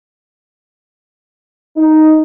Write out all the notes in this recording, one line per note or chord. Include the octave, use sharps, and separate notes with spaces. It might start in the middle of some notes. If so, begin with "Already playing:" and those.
D#4